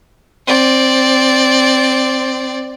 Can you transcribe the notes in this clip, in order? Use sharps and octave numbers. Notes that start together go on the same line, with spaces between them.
C4 D5